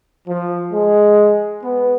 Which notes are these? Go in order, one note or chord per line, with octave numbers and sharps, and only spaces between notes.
F3
G#3
B3